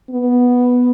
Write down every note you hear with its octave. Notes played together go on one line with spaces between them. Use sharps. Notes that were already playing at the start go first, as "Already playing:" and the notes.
B3